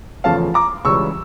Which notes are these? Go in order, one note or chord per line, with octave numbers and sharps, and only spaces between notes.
E2 C#3 F3 A3 C#4 F5 A5
A#5 D6
C#2 C#3 E3 G3 C#4 C#6 E6